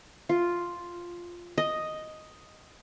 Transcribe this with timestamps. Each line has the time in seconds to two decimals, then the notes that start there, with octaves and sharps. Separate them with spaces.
0.29 F4
1.58 D#5